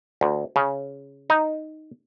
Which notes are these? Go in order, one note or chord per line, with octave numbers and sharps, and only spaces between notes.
D2
C#3
D#4